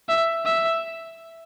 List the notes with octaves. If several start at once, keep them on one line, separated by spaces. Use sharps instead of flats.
E5
E5